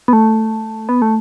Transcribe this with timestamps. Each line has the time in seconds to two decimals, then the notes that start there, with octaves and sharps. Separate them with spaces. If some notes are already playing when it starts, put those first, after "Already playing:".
0.08 B3
0.13 A3
0.89 B3
1.02 A3